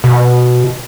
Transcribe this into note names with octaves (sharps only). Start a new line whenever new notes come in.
B2